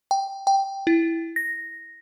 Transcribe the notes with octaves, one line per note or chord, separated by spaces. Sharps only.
G5
G5
E4
A#6